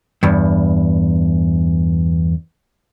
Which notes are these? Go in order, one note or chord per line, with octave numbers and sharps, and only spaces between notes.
E2 G2